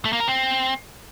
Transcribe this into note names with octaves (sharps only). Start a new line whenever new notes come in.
A3
A#3
A#4
C4